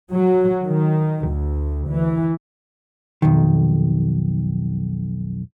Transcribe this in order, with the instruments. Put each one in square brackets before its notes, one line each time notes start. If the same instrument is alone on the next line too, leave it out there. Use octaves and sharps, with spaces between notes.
[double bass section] F#3
D#3
D2
E3
[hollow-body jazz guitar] B1 F2 D#3